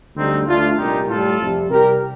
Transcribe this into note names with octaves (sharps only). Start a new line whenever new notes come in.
D2 D3 G3 C4 D#4
D2 D3 A3 D4 F4
C2 A#2 G3 D#4 G4
A2 G3 F4 A4
F2 C3 G3
C2 C3 G3 G4 A#4